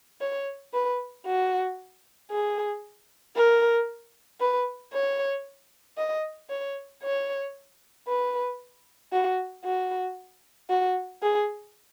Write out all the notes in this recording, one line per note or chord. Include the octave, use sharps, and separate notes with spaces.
C#5
B4
F#4
G#4
A#4
B4
C#5
D#5
C#5
C#5
B4
F#4
F#4
F#4
G#4